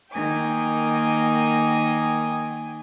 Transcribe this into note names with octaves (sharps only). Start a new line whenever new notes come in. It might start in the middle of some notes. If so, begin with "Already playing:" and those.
D#3 A#3 G5 G#5 D#6